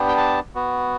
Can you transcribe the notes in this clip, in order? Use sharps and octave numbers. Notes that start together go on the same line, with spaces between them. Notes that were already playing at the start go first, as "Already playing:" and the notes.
Already playing: B3 D4 G4
G5
A5
B3 F#4